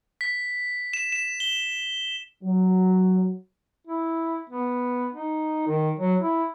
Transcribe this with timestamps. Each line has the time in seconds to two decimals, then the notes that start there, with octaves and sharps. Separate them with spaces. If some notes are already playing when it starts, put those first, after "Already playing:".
0.21 B6
0.94 E7
1.12 E7
1.40 G7
2.43 F#3
3.88 E4
4.50 B3
5.13 D#4
5.68 D#3
6.00 F#3
6.21 E4